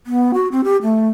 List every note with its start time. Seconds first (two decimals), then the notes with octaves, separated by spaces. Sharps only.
0.06 B3
0.34 F#4
0.52 C4
0.64 G4
0.82 A3